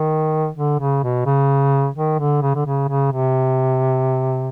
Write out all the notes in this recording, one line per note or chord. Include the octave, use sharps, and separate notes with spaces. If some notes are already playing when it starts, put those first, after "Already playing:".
Already playing: D#3
D3
C#3
B2
C#3
D#3
D3
C#3
D3
C#3
C#3
C3